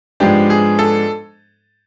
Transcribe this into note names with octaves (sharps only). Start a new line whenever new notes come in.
G#2 F3 G#3 B3 D4 G4
G#4
A4